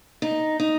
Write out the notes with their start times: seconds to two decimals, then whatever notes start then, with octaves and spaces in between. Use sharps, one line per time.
0.22 D#4
0.60 D#4